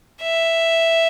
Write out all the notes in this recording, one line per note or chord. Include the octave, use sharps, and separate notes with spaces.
E5